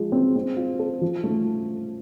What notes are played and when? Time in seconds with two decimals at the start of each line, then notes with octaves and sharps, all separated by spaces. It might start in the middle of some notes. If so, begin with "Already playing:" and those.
Already playing: F3 G#3
0.12 C4
0.36 C4
0.57 F4
0.79 A4
1.01 F3
1.24 A3